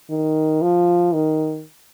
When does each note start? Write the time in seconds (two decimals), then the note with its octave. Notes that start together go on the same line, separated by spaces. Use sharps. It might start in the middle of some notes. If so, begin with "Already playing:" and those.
0.10 D#3
0.62 F3
1.14 D#3